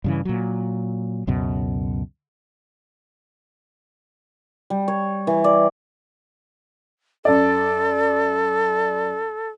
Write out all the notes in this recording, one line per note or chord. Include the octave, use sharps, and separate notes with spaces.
G2 C#3 E3
A#2 F#3
C#2 F#2 B2
G3
C#5
E3
D5
F#2 A4 D5